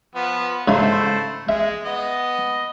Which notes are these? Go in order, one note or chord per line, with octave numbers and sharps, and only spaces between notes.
F3 B3
G#2 C#3 A3 D#4 E4 C5
G#3 E5
B3 D#5